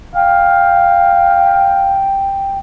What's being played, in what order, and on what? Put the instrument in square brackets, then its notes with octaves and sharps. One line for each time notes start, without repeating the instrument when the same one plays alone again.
[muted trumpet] F5 [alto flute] G5